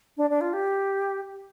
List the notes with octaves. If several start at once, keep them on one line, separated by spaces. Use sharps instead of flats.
D4
D4
F4
G4